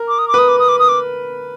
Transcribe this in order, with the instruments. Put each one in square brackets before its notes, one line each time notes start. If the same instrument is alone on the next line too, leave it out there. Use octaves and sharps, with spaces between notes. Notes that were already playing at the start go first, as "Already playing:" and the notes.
Already playing: [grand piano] A#4
[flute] D6
D#6
D6
[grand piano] B4 [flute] D#6
[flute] D6
D#6
D6
D#6
D6